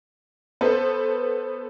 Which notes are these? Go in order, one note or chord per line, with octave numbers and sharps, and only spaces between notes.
B3 A4 C5